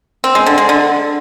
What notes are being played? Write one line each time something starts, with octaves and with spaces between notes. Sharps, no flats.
C4
G#3
D3
G#3
D3